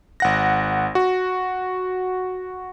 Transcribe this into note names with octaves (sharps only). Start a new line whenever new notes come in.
G#1 F#5 A#6
F#4